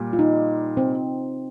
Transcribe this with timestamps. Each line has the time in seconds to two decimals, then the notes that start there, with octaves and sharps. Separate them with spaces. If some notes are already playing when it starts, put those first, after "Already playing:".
Already playing: A#2 G3
0.13 F4
0.19 D#4
0.77 C4